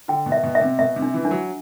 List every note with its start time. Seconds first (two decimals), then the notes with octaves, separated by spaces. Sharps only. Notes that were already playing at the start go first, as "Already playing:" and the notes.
0.08 D3 G5
0.26 B2
0.32 E5
0.43 B2
0.55 E5
0.61 C3
0.78 B2 E5
0.96 C3
1.02 D4
1.14 E3
1.25 D4
1.31 F#3